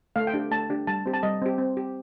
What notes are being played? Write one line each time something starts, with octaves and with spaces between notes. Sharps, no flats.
A3 F5
G5
D4 G4
A3 A5
D4 G4
G3 A5
C4 G4
A5
G3 D#5
C4 G4
C4
G4